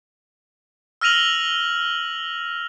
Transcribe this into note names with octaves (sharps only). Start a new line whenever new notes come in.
E6 F6 A#6 D#7 F7 F#7